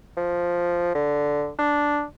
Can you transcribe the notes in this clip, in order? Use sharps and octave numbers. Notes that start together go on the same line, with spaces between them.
F3
D3
D4